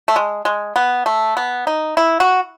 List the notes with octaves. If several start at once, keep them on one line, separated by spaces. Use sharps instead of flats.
A3
G#3
G#3
B3
A3
B3
D#4
E4
F#4